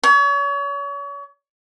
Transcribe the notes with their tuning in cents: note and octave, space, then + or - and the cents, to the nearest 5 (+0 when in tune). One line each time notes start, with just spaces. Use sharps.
C#5 +35